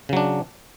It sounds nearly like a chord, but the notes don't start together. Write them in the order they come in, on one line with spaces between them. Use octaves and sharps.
C#3 F#3 D4